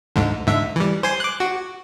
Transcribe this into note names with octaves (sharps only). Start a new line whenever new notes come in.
D2 G#2 D3
G#2 D3 E5
E3 G3
C5 G#5 C6
D6 F#6
F#4